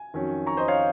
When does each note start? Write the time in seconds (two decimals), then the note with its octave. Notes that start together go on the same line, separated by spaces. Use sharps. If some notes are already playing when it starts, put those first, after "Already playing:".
Already playing: G#5
0.14 F2 D#3 F#3 C#4
0.47 A#5 C#6
0.57 C5 D#5
0.68 C#5 F5